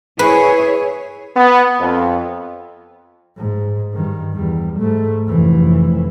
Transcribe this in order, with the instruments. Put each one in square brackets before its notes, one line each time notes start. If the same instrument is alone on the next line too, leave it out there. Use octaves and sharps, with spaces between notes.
[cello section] E4 G#4 C#5 [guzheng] B4
[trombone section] B3
F2
[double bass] G#2
G2 D#3
E2 G3
G#2 A3
F1 E3